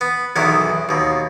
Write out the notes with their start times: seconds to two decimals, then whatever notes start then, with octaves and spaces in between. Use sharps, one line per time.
0.01 B3
0.36 B1 E2 D#3 B3 E4
0.89 D#2 B2